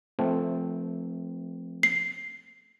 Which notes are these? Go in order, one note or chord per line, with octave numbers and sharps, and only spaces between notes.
F3 A3 C4
C7